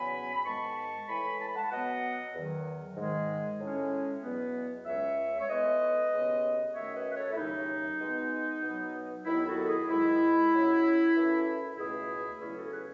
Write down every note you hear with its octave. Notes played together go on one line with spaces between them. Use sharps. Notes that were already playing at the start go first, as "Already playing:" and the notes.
Already playing: E2 C#3 F#3 B3 G#5 B5
B5
G#2 D#3 G#3 B3 A5 C#6
A2 E3 G#3 G#5 B5
A5
B5
F#5 A5
B2 F#3 B3 D#5 F#5
E2 D#3 F#3
G#2 D#3 G#3
A2 G#3 C#4
E2 B2 F#3 B3
C#2 C#3 G#3 C#4 C#5 E5
C#5
A2 G#3 B3 B4 D#5
D#2 C#3 G#3 B3
F#2 D#3 A3 C#4 C#5 E5
B4 D#5
B4
A4 C#5
E4
D#2 C#3 F#3 D#4
B2 G#3 B3
B2 F#3 B3
D#2 D#3 F#3 B3 E4
F#4 A4
E4 G#4
G#2 D#3 G#3 E4
F#2 C#3 F#3 C#4
F#2 E3 A3 C#4
C#2 B2 A3 C#4 E4 G#4
E2 C#3 F#3 A3 C#4 E4 G#4
F#4 A4
A4
G#4 B4